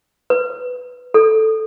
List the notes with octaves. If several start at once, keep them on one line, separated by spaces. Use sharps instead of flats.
B4
A4